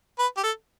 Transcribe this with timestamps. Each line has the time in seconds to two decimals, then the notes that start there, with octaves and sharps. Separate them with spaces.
0.19 B4
0.37 G4
0.43 A4